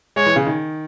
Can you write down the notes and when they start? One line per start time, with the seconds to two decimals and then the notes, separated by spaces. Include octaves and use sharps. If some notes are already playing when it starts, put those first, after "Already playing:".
0.16 G#3 C#5
0.26 E3
0.36 C#3
0.47 D#3